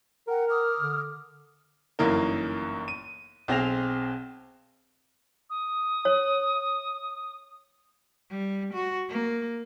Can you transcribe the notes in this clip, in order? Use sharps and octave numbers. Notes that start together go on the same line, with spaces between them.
A#4 F#5 G5
D6 D#6 F6
D3
G1 F#2 E3 A#3 D#4 A#4
D#7
B1 C4 G#4 A#6 F7
D#6
C#5
G3
F#4
A#3